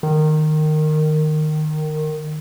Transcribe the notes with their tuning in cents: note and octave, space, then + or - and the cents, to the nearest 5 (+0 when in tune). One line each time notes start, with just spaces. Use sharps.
D#3 -15